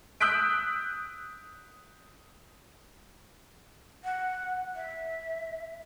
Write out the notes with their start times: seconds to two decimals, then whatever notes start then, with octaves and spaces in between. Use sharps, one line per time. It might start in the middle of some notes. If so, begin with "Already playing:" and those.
0.20 D#6 E6 F#6 G6 B6 D7
4.04 F#5
4.76 E5